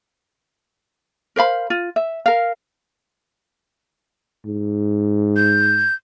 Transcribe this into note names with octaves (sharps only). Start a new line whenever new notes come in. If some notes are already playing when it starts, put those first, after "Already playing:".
A#4 C5 F5 B5
F4
E5
A#4 F5
G#2
G6